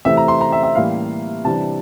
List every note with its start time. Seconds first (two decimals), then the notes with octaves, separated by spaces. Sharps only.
0.05 C3 E3 A3 C4 E5
0.17 A#5
0.28 C6
0.41 A#5
0.52 E5
0.63 E5
0.75 A2 E3 G3 A#3 F5
1.45 C3 E3 G3 D4 A5